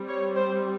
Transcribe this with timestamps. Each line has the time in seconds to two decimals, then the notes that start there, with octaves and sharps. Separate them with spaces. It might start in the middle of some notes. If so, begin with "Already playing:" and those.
Already playing: G3 C4
0.08 C#5
0.36 C5